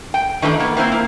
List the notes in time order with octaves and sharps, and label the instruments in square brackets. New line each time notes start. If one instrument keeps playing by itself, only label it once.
[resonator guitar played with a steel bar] G5
D#3 E3 A3 D4
A#3 B3
A#3 C4 E4 C5
A#3